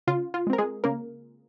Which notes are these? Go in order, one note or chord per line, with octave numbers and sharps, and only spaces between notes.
C#3 F4
F4
G#3
C4 A#4
G#3 G#4
C#3 A#3 A#4